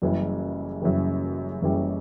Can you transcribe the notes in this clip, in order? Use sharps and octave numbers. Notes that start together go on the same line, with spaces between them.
F#1 F#2 C#3 E3 G3
F#1 F#2 C#3 E3 G3
F#1 F#2 C#3 E3 G3